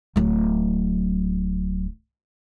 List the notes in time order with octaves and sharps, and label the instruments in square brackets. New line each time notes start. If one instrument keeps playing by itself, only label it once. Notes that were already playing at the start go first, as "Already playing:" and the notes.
[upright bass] D1 F#3